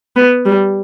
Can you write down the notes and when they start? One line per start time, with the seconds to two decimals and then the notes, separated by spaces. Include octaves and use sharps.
0.16 B3
0.46 G3